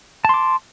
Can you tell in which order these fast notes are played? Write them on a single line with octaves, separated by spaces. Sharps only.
A5 C6 D6